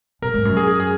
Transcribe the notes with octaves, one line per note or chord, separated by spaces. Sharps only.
B2 A#4
G#2
F#2
G#4
G#4
G#4